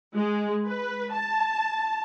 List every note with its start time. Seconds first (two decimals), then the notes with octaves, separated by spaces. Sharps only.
0.17 G#3
0.66 B4
1.13 A5